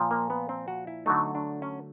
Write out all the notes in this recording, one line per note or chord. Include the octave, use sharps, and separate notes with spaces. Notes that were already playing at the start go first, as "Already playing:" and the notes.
Already playing: A#2 F3
A#3
B3
C4
F#4
E4
D3 F#3 A3 D#4
D4
C#4